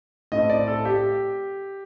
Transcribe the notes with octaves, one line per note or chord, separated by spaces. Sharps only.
A2 A3 C4 D#5
D5
A4
G4